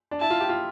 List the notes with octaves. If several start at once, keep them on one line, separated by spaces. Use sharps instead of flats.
D4
E4 A5
F4
G4
F4